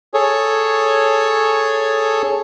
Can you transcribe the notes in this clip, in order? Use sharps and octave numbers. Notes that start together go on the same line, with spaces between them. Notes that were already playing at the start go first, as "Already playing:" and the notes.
G#4 A4 C#5